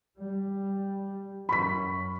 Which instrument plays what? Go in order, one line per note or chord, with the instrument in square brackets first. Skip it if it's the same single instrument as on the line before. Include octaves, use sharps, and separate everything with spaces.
[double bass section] G3
[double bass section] F#2 [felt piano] B5 C#6 B6